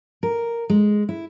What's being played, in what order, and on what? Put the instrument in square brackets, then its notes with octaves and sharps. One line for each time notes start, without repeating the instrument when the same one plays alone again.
[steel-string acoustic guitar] A#4
G#3
E4